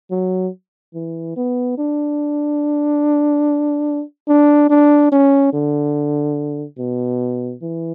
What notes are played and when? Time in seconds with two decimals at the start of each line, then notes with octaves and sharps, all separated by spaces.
0.11 F#3
0.95 E3
1.37 B3
1.78 D4
4.29 D4
4.70 D4
5.12 C#4
5.53 D3
6.79 B2
7.62 E3